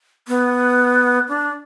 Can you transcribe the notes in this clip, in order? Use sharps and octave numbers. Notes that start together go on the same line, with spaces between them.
B3
D4